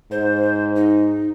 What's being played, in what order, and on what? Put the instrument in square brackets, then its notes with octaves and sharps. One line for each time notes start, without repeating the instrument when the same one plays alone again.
[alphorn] G#2 [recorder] C5
[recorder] D#4